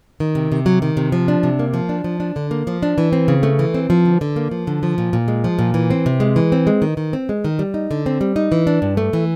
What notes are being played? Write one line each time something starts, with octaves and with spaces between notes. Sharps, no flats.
D#3
C3
C3
F#3
D#3
C3
F3
D4
C3
A#3
F3
D4
F3
D4
D3
A#3
F3
D4
E3
C4
C#3
A3
E3
C4
F3
D3
D3
A#3
F3
D3
F3
A#2
A#2
G#3
F3
A#2
E3
C4
C3
G#3
E3
C4
G#3
D#3
D#3
C4
G#3
D#3
G3
D#4
D3
C4
G3
D#4
E3
D4
G2
A3
E3